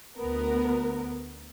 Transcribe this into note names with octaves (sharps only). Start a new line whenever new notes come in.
D2 B3 A#4